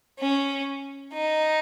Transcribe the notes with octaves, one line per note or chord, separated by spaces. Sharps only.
C#4
D#4